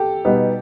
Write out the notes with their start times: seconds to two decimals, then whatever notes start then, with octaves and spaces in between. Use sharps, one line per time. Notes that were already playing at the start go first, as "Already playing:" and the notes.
Already playing: G4 A4
0.25 B2 G3 B3 D#4